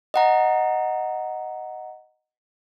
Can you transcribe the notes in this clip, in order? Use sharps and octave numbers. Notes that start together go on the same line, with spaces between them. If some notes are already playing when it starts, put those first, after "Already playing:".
D#5 F#5 A#5